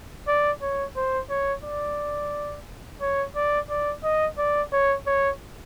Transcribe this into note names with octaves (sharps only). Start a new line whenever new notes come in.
D5
C#5
C5
C#5
D5
C#5
D5
D5
D#5
D5
C#5
C#5